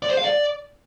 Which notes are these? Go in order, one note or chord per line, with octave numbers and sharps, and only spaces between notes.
D5
C5
F5
D5